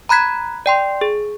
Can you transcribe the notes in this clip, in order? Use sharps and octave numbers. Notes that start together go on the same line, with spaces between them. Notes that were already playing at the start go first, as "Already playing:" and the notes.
A#5 B5 F#6 G#6 B6
D5 G5 C6
G#4